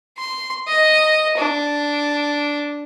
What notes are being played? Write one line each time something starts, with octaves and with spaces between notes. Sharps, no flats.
C6
D#5
D4